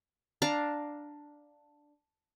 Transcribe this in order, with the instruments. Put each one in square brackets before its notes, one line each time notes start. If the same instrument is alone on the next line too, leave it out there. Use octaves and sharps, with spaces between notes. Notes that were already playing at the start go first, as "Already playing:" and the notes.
[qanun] D4 F5 A#5